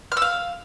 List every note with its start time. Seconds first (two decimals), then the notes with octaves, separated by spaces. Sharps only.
0.12 F6
0.17 E6
0.22 F5